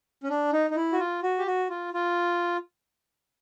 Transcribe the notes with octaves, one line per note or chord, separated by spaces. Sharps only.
C#4
D4
D#4
D#4
E4
F#4
F4
F#4
G4
F#4
F4
F4